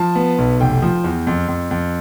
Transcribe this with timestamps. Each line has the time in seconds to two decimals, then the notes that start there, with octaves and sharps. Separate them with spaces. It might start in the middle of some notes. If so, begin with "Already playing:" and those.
Already playing: F3 A5
0.15 B3
0.38 B1
0.60 F1 G5
0.82 F3
1.04 E2
1.27 F2
1.48 F2
1.71 F2